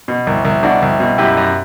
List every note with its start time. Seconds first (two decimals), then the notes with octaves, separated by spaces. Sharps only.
0.08 B2
0.27 C2
0.45 C2
0.63 B2 D4 F#4
0.82 C2
1.00 B2
1.18 F#2 E4 G4
1.37 F#2